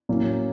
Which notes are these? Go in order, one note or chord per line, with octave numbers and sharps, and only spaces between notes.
A2 F#3 A#3 C#4